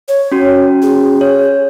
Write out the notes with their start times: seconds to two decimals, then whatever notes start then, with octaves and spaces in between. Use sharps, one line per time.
0.08 C#5
0.32 C#4 F#4
0.82 G#4
1.21 C#5